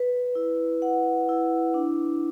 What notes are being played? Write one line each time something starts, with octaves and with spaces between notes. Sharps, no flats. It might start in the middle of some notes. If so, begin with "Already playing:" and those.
Already playing: B4
E4
F#5
E4
D4